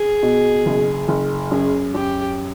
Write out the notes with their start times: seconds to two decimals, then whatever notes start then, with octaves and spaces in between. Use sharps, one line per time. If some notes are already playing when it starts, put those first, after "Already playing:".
Already playing: G#4
0.23 B2
0.66 F#1
1.08 F#1
1.51 F#2 G#4
1.94 F#2 G4